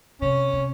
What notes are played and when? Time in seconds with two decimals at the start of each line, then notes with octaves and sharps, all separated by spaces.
0.21 C3 C#4
0.53 C3